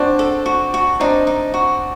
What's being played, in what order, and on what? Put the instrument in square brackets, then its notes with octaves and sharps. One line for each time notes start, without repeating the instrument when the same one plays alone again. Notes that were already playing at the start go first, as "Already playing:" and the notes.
Already playing: [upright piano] C4 D4 [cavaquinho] F#4
[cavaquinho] A4
F#4
F#4
[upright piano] C4 D4 [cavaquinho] D#4
[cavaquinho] D#4
F#4